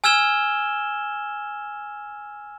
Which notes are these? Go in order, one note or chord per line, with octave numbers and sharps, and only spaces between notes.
G#5 E6 F6 G#6 E7 G7